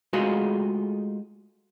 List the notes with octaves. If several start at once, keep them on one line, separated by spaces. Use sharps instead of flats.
G#3 A3 D#4 F4 F#4 G#4